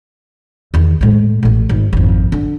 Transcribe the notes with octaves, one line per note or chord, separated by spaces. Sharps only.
E2 D#3
A2 G#3
A1 A2
G#1
G#1 F2
D3